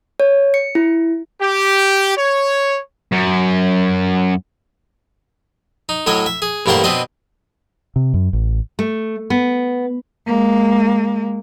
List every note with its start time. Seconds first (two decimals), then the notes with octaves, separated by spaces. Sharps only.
0.20 C#5
0.54 C#7
0.75 E4
1.40 G4
2.17 C#5
3.12 F#2
5.89 D#4
6.06 A2 F#3 C#5 D#5
6.26 E5
6.42 G#4
6.66 A1 G2 G3 A#3 C5 F#5
6.84 B2 C4 D4 B4 D#5
7.96 C3
8.14 F#2
8.33 A1
8.79 A3
9.30 B3
10.27 G#3 A#3